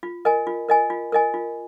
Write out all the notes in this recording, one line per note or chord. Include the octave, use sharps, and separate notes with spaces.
F4
A#4 D#5 G#5
F4
A#4 D#5 G#5
F4
A#4 D#5 G#5
F4